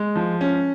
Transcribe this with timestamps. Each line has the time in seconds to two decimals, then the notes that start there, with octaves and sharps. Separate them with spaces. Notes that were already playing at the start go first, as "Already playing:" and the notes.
Already playing: G#3
0.16 F3
0.41 C#4